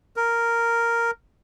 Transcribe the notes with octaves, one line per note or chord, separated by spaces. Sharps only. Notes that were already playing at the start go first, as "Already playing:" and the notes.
A#4